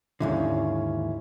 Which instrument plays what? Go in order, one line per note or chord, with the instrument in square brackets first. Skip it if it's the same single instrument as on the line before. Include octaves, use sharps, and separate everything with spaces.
[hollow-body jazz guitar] D#2 G#2 D3 [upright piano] C#4 E4 F4